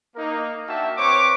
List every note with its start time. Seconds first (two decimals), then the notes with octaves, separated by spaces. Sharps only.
0.16 A#3 D#4 A#4
0.68 A#3 D4 F#4 E5 G5 A5
0.97 C4 B4 C#5 C#6 D6